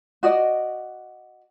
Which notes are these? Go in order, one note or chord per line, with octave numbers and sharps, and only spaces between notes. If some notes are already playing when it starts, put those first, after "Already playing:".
F#4 D5 D#5